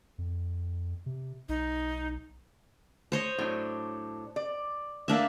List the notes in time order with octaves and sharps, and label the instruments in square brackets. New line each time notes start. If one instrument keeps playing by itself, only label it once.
[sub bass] F2
C3
[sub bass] B1 [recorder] D#4
[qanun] C5 C#5 D#5
[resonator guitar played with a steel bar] A2 F#3 D4
D5
[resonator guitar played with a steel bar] D3 [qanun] A#3 D4 E5